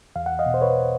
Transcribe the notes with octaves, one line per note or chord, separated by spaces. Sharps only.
E2 F5
F#5
D#5 F5
B2
C5
B4 C#5